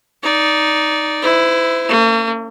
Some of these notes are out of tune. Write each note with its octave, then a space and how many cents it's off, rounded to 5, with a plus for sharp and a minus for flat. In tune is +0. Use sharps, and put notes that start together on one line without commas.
D#4 +0 D5 -10
E4 +5 C5 -40
A#3 -45 C#4 +0